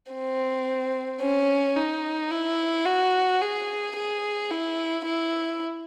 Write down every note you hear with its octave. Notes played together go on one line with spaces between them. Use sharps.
C4
C#4
D#4
E4
F#4
G#4
G#4
E4
E4